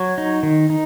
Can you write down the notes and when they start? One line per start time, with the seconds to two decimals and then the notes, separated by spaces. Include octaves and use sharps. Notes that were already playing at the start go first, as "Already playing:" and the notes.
Already playing: F#3 C#5
0.18 D#4
0.43 D#3
0.70 D#4